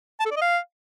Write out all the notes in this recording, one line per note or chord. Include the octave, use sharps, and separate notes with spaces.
A5
A4
D5
D#5
F5